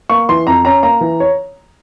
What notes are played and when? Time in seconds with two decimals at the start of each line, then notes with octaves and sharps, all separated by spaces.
0.10 A#3 C#6
0.29 E3 C6
0.47 F2 A#5
0.65 C#4 A#5
0.83 A#3 A#5
1.01 E3
1.20 C#5